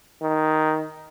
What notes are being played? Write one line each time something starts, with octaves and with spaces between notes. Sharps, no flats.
D#3